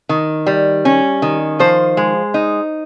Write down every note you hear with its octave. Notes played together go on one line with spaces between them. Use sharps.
D#3
G3
C#4
D#3
F3 C5
G#3
D#4